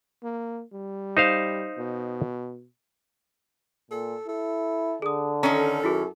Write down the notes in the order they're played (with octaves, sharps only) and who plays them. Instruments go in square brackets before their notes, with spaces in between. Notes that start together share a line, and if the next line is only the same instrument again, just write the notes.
[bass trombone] A#3
G3
[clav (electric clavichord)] D#4 C5 F5
[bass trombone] B2
[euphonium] A#2 [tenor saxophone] A4
[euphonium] E4 [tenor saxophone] A4
[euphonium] D3 [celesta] G#4 D#6
[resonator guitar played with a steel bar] D#3 C#4 [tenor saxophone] A4 [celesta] A#5
[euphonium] F#2 [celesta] E4 F#4 G#4